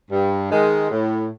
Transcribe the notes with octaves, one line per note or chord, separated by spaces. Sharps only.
G2
D#3 G#3
A2